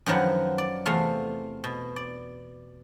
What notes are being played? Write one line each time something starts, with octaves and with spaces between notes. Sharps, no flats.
F#2 D#3 F3 F#3 B4 F#5
D5
E2 C3 A3 F4 F5
B2
D5